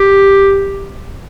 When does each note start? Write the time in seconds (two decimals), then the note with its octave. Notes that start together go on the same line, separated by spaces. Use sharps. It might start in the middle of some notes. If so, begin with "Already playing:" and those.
Already playing: G4